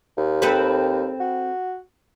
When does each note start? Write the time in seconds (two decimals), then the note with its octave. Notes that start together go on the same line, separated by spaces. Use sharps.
0.17 D#2
0.42 C4 A4 B4
1.20 F#4